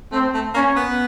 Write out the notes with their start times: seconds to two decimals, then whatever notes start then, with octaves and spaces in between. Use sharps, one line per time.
0.12 A3 C4
0.34 A3
0.54 A#3 C#4
0.76 B3